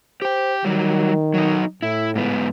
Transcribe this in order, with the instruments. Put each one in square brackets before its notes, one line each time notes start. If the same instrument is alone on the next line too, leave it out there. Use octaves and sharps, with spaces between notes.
[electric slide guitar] G4 G5 [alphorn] C5
[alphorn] D#3 [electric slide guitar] F#3 G3
[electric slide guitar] F#3 D#4
[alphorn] A2 [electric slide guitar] E4
[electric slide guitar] G#2 B3